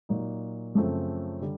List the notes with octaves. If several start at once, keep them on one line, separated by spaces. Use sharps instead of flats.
A#2 F#3 A#3 D#4
F#2 C#3 F3 A3 C4
D3 G3